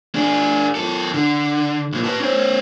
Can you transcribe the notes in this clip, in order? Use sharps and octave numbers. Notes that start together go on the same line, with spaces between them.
D4 G#4
F#2 A4
D3
B1 A#2
B4 A5
C#4 C5